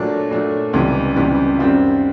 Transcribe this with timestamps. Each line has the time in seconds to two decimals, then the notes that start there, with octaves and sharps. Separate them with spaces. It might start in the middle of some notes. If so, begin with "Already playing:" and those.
Already playing: A#2 F#3 A3 D4
0.31 A#2 F#3 A3 D4
0.73 C#2 C3 E3 G3
1.16 C#2 C3 E3 G3
1.59 F#2 D#3 G3 C4 F4